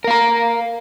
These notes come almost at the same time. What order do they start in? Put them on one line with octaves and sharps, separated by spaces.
A#4 F5 A#5